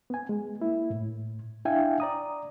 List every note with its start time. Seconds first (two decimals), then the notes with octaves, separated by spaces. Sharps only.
0.10 B3 G#5
0.29 G#3
0.60 A#3 E4
0.90 A2
1.65 D4 E4 E5 F5 G5 G#5
2.00 D5 A#5 D#6